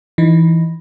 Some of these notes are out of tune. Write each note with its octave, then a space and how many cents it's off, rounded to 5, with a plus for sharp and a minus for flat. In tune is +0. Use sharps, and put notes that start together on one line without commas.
E3 +0 D#4 +0